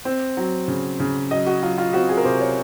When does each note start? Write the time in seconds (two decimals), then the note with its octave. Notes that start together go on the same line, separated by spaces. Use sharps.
0.05 C4
0.37 F#3
0.68 C#3
0.99 C#3
1.31 F#3 D#5
1.46 F#4
1.63 F#3 F4
1.78 F4
1.93 C4 F#4
2.09 G#4
2.17 A#4
2.25 C3 C5
2.41 C#5